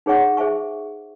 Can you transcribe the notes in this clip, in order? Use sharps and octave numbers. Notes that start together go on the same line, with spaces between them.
D#4 G#4 C#5 F#5 C#6
G#4 C5 E5 G#5 C#6